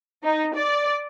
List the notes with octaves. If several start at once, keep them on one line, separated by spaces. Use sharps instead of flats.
D#4
D5